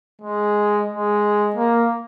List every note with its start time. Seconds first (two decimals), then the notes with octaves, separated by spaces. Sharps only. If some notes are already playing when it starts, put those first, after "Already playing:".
0.22 G#3
0.89 G#3
1.56 A#3